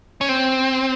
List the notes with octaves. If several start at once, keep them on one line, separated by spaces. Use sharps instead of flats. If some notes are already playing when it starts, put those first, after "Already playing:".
C#4
C4